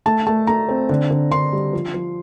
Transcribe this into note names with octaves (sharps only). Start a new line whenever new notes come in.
A3 A5
A3 A5
A3 A#5
C4
D3
D3
D3 C6
G3
F3
F3